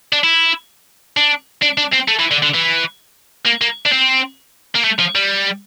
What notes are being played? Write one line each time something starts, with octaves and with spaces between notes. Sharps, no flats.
D4
E4
D4
D4
D4
C4
A3
E3
D3
D3
E3
A#3
A#3
D4
C4
A#3
A3
F3
G3